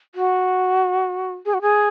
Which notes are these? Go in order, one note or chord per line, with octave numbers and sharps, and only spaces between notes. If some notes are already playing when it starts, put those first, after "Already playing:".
F#4
G#4
F#4
G#4